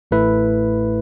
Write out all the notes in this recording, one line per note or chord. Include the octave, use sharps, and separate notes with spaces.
A1 A2 A3 E4 B4